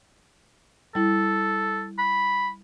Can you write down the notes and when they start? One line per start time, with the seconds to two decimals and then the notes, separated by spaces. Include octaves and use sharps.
0.95 G3 E4 A4
1.98 B5